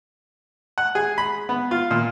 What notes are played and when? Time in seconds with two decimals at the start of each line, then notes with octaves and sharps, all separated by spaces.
0.78 F#5
0.95 G#4
1.18 B5
1.49 B3
1.71 F4
1.91 A#2